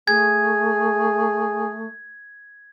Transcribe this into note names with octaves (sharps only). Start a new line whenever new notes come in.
A3 G#4 G#6